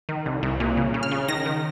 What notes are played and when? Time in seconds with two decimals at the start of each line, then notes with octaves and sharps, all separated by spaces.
0.09 D#3
0.26 C2
0.43 C2
0.60 A#2
0.77 C#3
0.94 C#3
1.03 F6
1.12 C#3
1.28 D#3 A#6
1.46 D#3